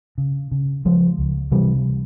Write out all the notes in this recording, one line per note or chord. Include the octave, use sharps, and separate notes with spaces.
C#3
C#3
C#3 F3 G#3
C#2
C3 E3 G3